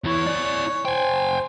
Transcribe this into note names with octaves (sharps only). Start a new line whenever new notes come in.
E2 E4 C#5
E4 D5
C5 G5 G#5